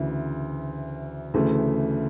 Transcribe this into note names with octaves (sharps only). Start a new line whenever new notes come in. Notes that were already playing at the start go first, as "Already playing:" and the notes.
Already playing: D2 C#3 E3
D2 C#3 E3 A3